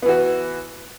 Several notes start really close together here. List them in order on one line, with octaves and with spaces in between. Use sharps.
B3 E3 F#4